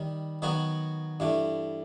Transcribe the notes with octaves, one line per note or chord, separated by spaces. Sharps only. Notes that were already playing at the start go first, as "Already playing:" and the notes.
Already playing: D#3 G3
D#3 F#3 B3 F#4
G2 E3 A3